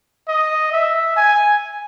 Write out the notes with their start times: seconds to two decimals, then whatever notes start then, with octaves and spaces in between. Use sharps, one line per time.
0.28 D#5
0.72 E5
1.17 G#5